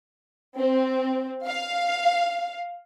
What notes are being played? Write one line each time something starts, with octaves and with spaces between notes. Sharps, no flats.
C4
F5